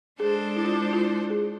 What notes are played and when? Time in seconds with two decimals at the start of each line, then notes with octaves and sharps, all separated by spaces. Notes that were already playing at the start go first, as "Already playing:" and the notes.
0.20 G#3 D4 G#4 A4 C5
0.56 E4
0.65 F4
0.73 E4
0.93 F4
1.30 G#4